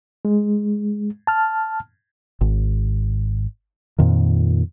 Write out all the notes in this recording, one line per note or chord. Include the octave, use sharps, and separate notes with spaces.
G#3
A5 F6
G#1
F2 A#2 D#3